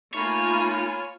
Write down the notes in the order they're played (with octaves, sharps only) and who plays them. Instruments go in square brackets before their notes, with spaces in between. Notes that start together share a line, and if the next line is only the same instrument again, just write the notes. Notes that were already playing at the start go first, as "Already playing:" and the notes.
[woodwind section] A3 D#4 [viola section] A#3 F4 [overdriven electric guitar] C#5 [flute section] G#5 B5